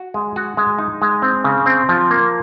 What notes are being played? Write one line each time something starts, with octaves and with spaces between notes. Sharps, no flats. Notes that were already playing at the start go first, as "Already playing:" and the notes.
Already playing: F#4
G#3
F#4
G#3
D#4
G#3
C4
C#3
C4
F3
A#3